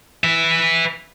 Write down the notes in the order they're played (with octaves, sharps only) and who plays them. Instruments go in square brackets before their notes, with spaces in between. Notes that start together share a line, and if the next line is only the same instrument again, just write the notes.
[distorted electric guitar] B4 E5